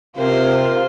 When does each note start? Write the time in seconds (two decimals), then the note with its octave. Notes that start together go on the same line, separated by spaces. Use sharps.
0.18 C3 F4 A#4 C5